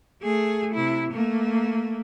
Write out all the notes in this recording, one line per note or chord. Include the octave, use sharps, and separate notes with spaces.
A3 G#4
C3 E4
A3 A#3